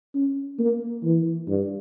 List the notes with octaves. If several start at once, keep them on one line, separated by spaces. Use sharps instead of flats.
C#4
A#3
E3
G2